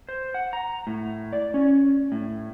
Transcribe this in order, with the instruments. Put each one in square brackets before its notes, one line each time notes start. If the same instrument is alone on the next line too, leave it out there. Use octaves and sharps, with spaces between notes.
[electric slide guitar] C5
F#5
A#5
A2
D5
C#4
A2